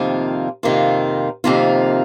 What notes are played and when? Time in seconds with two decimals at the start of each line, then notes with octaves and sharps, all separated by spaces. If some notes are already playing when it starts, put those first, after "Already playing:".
Already playing: F2 C3 D#3 A#3 F4
0.63 F2 C3 D#3 A#3 F4
1.44 F2 C3 D#3 A#3 F4